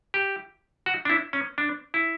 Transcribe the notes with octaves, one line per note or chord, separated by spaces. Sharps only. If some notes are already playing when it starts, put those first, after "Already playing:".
G4
F#4
D4
E4
C#4
D4
E4